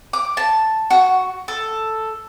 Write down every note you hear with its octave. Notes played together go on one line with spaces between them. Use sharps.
D6
A5
F#4
A4